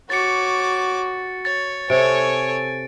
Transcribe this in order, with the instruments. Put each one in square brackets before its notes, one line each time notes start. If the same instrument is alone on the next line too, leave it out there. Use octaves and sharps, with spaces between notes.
[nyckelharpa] F#4 [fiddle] C#5 D6 [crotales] A6 C#7
[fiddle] C#5 [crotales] A6
[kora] C3 [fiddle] A4 C#5 [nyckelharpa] G#5 [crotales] D7